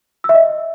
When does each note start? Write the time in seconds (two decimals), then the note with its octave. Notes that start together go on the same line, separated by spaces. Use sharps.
0.24 E6
0.29 E5
0.34 D#5